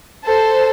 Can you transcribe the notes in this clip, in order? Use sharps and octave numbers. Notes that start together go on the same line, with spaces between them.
A4 C5